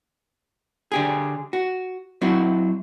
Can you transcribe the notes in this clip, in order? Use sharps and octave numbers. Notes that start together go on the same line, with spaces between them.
D3 G4 G#4
F#4
F#3 C4 E4 F#4